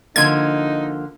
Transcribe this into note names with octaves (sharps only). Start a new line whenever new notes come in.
D3 F3 A#3 D#4 G#6